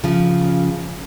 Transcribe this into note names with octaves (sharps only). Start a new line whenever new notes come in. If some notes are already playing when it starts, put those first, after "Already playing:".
C#3 F3